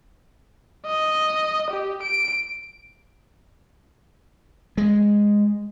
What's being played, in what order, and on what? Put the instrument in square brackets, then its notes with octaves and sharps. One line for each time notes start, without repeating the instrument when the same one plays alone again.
[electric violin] D#5
G4
D7
[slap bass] G#3